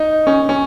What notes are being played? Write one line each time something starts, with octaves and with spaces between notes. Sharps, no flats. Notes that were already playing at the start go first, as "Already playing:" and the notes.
Already playing: D#4
C#4
C#4